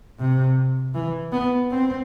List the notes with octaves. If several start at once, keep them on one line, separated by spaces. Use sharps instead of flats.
C3
E3
B3
C4